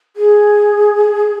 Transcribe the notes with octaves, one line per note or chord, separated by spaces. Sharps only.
G#4